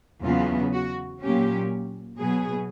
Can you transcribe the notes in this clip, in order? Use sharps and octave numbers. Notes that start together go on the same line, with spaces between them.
E2 C#3 F#3 B3 F4
F#4
A#2 F#3 A#3 C#4 G4
B2 F#3 B3 G#4